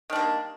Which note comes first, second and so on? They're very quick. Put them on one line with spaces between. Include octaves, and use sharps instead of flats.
D#3 D4 G3 A#3